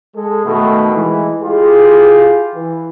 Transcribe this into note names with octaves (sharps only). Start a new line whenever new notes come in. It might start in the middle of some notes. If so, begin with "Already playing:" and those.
G#3 A4
B2 D#3 A3
E3 G#3
E4 F4 G4 G#4
E3